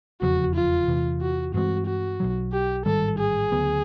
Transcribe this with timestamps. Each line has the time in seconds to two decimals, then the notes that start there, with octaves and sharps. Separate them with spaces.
0.21 F1 E2 C#3 F3 F#4
0.55 F4
0.88 E2 C3 E3
1.21 F#4
1.54 G2 E3 G#3 C4 F#4
1.86 F#4
2.20 B1 B2 F#3
2.52 G4
2.85 A1 G#2 D#3 G3 A4
3.19 G#4
3.52 D2 C#3 F#3 B3